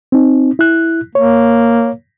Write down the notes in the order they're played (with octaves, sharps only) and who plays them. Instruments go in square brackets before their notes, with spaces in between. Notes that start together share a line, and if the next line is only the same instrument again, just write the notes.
[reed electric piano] C4 D#4
E4 F#6
[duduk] A#3 [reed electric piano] C#5